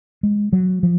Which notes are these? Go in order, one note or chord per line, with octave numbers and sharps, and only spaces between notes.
G#3
F#3
F3